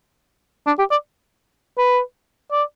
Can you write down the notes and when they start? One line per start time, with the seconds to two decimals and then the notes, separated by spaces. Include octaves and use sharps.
0.67 D4
0.79 G4
0.91 D5
1.78 B4
2.52 D5